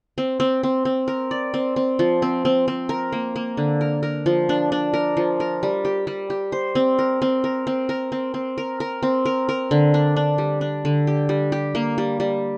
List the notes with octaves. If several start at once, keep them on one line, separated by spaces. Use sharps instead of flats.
C4
C4
C4
C4
A#4
D5
C4
C4
F3
C4
C4
C4
A#4
A#3
A#3
D3
A#4
A#4
F3
D4
D4
A#4
F3
A#4
G3
G4
G3
G4
C5
C4
A#4
C4
A#4
C4
A#4
C4
C4
A#4
A#4
C4
A#4
A#4
D3
D4
D4
G3
D4
D3
G4
G3
G4
A#3
G3
G3